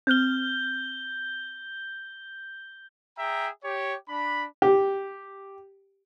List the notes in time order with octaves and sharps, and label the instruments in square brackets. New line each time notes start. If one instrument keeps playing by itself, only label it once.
[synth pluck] C4 F6 [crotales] G6 G7
[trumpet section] G#4 E5 G5 A#5
G4 C#5
D4 B5
[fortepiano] G4